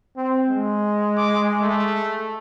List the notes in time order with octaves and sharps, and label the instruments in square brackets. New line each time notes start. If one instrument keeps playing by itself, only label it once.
[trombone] C4
G#3
[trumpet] D6
A3